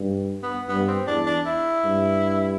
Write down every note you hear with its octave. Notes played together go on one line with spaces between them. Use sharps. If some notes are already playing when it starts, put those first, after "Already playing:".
Already playing: G2
B3
G2 B3
C4
E2 D4
D4
E4
G2